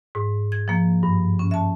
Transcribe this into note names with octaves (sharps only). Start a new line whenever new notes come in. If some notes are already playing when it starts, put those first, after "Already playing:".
G#2
G#6
F3 A#3
G2
C#4
E5 A5